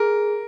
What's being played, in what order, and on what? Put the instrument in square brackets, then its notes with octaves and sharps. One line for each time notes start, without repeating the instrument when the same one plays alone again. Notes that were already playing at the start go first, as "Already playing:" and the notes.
Already playing: [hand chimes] G#4 [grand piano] A#4